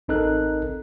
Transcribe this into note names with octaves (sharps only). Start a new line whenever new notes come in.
A1 C4 D#4 A4 A#4 F#6